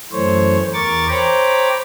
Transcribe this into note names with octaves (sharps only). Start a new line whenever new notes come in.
F#2 E3 A3 C5 C#5
E2 A#4 C#6 D6 A6
C5 C#5 G5 A#5 B5 D6